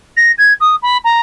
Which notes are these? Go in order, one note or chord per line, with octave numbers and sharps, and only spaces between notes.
A#6
G#6
D#6
B5
A#5